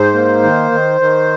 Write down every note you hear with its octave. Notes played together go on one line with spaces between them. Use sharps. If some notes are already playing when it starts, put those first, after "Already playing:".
Already playing: G#2 C5
A#3
D#3
D#3
D#3